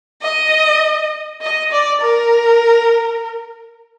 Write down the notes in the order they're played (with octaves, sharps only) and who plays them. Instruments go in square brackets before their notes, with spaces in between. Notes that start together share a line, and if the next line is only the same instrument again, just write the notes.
[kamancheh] D#5
D#5
D5
A#4